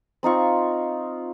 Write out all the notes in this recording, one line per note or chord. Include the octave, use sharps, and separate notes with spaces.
C4 D#4 F4 C#6